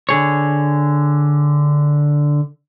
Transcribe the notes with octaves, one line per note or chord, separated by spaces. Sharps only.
D3 G#4 C#5